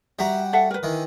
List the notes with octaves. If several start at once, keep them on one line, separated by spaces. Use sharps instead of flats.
G3 F#4 E5 A#5
A4 E5 F#5
A#4 B4
D#3 E3